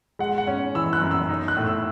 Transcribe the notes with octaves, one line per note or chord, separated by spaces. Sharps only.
G#3 F#5
F#5
C#4
E3 E6
F#6
F#2
E6
D#4
F#6
A2
E6